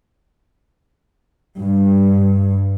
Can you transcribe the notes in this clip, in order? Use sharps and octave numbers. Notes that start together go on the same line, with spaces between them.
G2